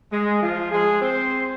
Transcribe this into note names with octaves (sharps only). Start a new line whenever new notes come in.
G#3
F3 F4
G#3 G#4
C4 C5